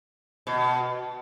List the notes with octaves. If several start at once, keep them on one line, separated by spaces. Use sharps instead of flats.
B2